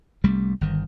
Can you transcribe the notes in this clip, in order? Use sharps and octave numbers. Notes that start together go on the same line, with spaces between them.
C2 G3 A3
G1 D#3